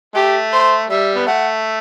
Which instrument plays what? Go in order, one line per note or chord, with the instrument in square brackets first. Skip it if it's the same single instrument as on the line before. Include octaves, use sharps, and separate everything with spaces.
[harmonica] A3 [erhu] G4
[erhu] C5
[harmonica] G3 [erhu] E5
[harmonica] B3
[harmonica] A3 [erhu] F#5